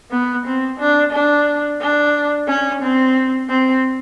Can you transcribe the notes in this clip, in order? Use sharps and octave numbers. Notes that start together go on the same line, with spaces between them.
B3
C4
D4
D4
D4
C#4
C4
C4